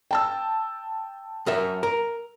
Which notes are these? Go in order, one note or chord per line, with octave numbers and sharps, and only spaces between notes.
G5 A5 E6
F#2 A#4 E5
A#4